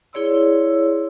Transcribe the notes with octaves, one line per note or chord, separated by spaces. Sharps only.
E4 G#4 C#5 D5 C6 E6